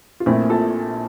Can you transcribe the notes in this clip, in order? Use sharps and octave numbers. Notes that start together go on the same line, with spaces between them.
F4
A#1 A#2 A3 C4 E4
F4 A4